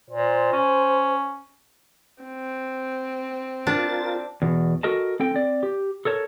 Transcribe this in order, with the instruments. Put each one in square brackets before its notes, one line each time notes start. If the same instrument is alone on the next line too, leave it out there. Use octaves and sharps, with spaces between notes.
[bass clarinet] A#2 [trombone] C5
[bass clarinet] C#4
[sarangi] C4
[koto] D4 [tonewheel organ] F4 A#4 A6
[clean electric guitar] E2 B2
F#4 A4 A#4 D#5 A5
C4 A4 G5
C4 D5
G4
A4 A#4 C#5 A5